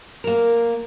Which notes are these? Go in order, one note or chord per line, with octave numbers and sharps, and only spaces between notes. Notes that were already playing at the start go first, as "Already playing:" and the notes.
A#3 A#4